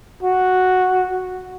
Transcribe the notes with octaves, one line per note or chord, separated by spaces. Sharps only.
F#4